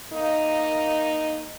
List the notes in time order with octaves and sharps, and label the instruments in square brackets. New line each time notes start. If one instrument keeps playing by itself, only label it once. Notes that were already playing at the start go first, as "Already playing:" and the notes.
[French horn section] A#3 D#4